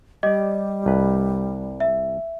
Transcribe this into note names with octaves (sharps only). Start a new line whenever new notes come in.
G3 G4 D5 D#5
C2 B4
E5